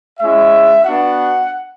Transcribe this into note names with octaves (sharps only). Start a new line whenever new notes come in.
G#3 C#4 E4 E5
B3 D4 F#4 F#5